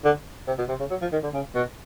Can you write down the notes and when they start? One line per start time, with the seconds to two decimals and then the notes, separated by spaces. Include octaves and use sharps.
0.04 D3
0.47 C3
0.58 B2
0.69 C3
0.80 C#3
0.90 F#3
1.01 F3
1.12 D#3
1.23 D3
1.34 C#3
1.55 B2